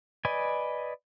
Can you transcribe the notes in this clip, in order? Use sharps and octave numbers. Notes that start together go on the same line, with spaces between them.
B4 D5 D#5 G#5